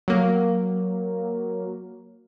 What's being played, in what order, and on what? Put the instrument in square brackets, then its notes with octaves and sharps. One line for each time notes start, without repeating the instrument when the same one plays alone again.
[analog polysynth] F#3 A#3